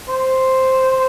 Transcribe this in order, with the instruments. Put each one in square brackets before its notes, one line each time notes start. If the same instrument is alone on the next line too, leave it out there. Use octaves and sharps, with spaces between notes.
[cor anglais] C5